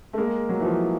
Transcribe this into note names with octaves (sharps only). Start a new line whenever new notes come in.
A3
G#3 A#3
F#3
E3
F3